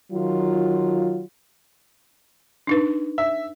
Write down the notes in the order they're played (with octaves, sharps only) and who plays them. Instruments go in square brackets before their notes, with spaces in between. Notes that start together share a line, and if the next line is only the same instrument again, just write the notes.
[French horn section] D#3 F#3 F4
[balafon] D4 D#4 B4
[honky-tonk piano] E5